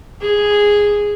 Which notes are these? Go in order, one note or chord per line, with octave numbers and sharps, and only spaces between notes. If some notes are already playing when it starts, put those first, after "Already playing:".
G#4